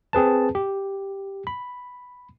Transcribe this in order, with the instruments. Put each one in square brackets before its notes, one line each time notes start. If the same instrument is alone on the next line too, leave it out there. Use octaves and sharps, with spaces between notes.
[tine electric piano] C4 G#4 B4 A5
G4
B5